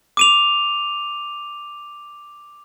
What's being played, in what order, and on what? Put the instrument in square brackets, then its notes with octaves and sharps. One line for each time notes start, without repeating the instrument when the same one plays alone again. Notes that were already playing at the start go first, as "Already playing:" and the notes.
[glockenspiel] D6 D#7 F7